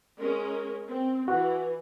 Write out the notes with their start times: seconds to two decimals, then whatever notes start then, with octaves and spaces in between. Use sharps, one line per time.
0.19 G#3 C#4 A#4
0.88 C4
1.28 E3 F#4